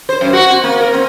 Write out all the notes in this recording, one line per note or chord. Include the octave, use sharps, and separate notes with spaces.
C5
F#2
F#4
C4
A#3
A#4
C4